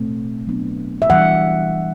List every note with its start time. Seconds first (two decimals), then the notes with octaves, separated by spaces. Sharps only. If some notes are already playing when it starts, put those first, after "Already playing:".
Already playing: B2 A3 C4
0.47 F#3 B3 D4
1.02 E5
1.10 E3 G3 D4 F#5